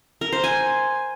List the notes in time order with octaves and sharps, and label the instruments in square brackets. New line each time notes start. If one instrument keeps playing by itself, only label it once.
[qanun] A#4
C5
G#5